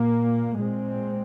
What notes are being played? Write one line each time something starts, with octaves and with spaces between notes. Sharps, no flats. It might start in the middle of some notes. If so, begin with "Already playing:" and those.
Already playing: A#2 A#3
A#2 G#3 C4